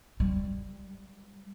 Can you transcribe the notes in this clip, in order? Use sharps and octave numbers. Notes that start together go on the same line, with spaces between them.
G3